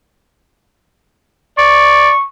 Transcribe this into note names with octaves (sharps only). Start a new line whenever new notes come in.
D5 C#6